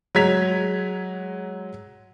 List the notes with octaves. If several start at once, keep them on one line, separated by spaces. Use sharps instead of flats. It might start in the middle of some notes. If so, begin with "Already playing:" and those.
F#3 G#3 A#5 G#6 B6 F7